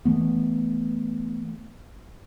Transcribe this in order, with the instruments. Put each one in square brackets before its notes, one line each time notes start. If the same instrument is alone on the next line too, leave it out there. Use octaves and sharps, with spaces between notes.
[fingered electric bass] E3 A3 B3